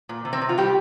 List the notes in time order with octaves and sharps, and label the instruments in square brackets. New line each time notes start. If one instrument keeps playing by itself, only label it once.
[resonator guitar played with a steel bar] A#2
C3
C4
C3
F4
G3 G4